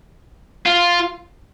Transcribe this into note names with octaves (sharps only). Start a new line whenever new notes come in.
F4